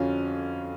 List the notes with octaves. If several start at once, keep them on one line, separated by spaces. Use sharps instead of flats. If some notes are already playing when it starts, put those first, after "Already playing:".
Already playing: F2 D3 C#4 F4 F#4